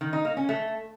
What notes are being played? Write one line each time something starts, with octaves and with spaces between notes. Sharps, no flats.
D#3
D#4
A#3
C#4
A3